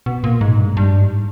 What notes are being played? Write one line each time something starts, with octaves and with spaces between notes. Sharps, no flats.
B2
A#2
G#2
G2
G2
G#2